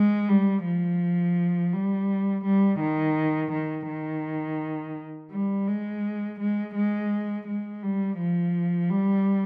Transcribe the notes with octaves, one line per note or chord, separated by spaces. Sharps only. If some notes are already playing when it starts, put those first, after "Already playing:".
Already playing: G#3
G3
F3
G3
G3
D#3
D#3
D#3
G3
G#3
G#3
G#3
G#3
G3
F3
G3